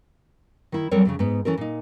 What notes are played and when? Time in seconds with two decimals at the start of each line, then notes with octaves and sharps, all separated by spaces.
0.72 D#3 E4
0.91 F#3 G3 C4 A4 A#4 C#5
1.05 F2 A#2 C#3
1.19 G#2 B3
1.45 E3 C#4 A4 A#4
1.57 A#2 D#4